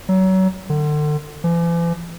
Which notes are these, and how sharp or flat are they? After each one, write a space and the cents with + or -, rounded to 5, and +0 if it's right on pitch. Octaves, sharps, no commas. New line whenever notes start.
F#3 +30
D3 +35
E3 +45